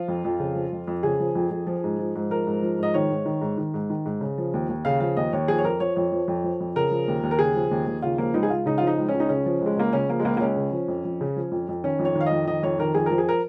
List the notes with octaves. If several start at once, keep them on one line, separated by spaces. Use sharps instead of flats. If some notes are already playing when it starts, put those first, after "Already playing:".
Already playing: F3 F4
F2
F2
C#3
F3
F2
F2
C#3 G#4
F3
F2
F2
F3
G#2
F3
G#2
F3 A#4
G#2
F3
G#2 D#5
D#3 C#5
G#2
D#3
G#2
D#3
G#2
D#3
G#2
C#3
F3
D#2
D#2
C#3 F5
F3 F5
D#2 D#5
D#2 C#5
F3 G#4
C#5
F2 A#4
F3 C#5
F2 C#5
F3
F2
F3
F2
C#3 A#4
F3
D#2
D#2
A#4
C#3 G#4
F3
D#2
D#2
C#3 F4
F3 A#3
C#2 D#4
G#4
C#2 F4
C#3 D#4
F4
F3 D#4
C#2
C#4
C#2
D#4
C#3 C#4
F3
C#2
G#3
C#2 A#3
C#3 C#4
F3 A#3
G#3
C#2 A#3
A#3
C#2 C#4
C#3
F3
F2
F2
C#3
F3
F2
F2
D#3 C#4
F2
C#5
D#3
F5
D#5
F2
D#3 D#5
F2 C#5
D#3 A#4
F2 G#4
F3 A#4
G#4
A#4